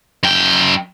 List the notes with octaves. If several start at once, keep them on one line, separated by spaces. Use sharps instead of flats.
F#2 G5